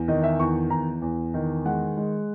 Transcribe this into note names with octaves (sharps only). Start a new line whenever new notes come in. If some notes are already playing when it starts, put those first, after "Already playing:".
Already playing: E2
D#3 D#5
E5
E2 C#6
E2 A#5
E2
D#3
G#3 F#5
G#3